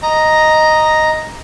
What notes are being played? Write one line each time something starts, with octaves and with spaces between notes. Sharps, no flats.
D#5 A#5